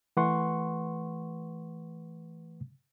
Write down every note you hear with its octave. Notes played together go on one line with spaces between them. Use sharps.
E3 A3 B4 F#5 C6 C#6